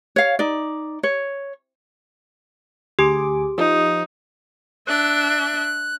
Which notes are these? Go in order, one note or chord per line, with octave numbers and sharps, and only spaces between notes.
C#5 F5
D#4 D5
C#5
D2 G4 G#4 D6
F3 D#4
D4 E5 F#6